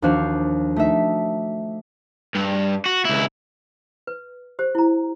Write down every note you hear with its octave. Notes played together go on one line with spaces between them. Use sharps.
D#2 F3 D4 F#4 C5 F5
A3 D#4 E5
G2
F#4
C#2 E4
B4
G4 C5
E4 A#5